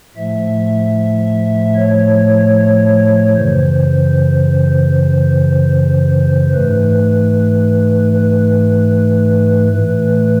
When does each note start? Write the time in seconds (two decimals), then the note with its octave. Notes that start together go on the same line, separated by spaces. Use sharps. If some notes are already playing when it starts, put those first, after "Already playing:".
0.16 A2 F3 A3 E5
1.76 C#5
3.35 F#2 C#3 E3 C5
6.53 G#2 E3 A3 B4
8.13 B4
9.72 A2 E3 A3 B4